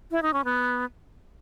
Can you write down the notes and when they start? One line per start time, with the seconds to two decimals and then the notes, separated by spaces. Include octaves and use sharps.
0.11 E4
0.23 D#4
0.34 C#4
0.45 B3